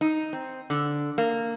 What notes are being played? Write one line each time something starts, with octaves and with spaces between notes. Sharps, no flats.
D#4
C4
D3
A#3